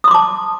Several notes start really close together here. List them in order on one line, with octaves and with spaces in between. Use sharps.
D#6 C6 D6 A5